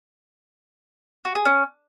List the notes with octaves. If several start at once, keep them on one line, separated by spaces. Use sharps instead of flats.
F#4
G#4
C#4